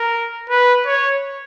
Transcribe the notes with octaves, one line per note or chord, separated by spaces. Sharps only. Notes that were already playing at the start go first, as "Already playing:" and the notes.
Already playing: A#4
B4
C#5